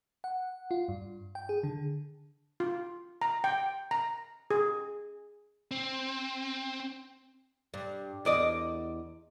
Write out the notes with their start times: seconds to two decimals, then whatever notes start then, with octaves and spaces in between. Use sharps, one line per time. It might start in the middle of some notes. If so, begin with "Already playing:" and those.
0.24 F#5
0.71 F4
0.88 G2
1.35 G5
1.49 G#4
1.63 D3
2.60 F4
3.22 A#5
3.44 G5
3.91 A#5
4.51 G#4
5.71 C4
7.74 G2
8.25 E2 D5 D#5